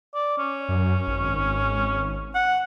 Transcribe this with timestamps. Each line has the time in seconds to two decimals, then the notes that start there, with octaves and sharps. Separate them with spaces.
0.14 D5
0.38 C#4
0.69 F#2
1.07 G#1
2.34 F#5